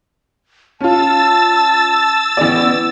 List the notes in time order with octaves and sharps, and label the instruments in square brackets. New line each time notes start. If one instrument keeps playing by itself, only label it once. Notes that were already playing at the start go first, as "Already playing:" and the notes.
[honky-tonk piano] C#4 F4 [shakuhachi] A5 [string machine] E6 A6
[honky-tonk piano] A1 D5 [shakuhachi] B3